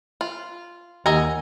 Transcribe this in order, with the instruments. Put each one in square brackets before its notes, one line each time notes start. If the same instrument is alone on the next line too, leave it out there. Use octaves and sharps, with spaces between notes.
[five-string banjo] F4 [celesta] F#7
[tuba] D#2 [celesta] G4 F#5 E6 [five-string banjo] D#5 G#5 A#5